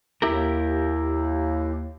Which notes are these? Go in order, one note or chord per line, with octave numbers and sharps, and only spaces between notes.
D#2 E4 G4 A#4